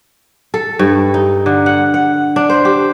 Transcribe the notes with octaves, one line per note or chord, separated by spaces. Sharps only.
A4
G2
D#4
D3
F#5
F#5
D4
C5
G4